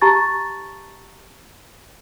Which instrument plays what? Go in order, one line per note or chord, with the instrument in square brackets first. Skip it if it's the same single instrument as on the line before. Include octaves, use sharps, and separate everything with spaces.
[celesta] G4 A5 A#5 C#6 A6